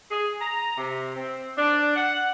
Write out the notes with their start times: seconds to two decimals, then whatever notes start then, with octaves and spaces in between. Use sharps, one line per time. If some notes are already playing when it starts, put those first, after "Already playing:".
0.11 G#4
0.41 A#5
0.77 C3
1.16 C4
1.58 D4
1.96 F#5